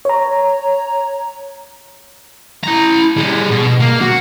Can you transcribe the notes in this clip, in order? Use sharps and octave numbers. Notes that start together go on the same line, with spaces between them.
C#5 A#5
E4 A#5
G3 G#4
B2
A#3
F#4